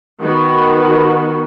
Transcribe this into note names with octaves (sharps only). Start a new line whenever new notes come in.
D#3 B3 F#4